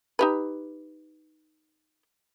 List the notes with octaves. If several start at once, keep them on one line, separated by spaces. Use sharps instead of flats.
D#4 G4 B4